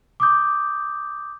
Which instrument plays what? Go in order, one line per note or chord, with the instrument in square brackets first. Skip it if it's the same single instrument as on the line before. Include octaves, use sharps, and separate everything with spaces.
[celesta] D6 D#6 G6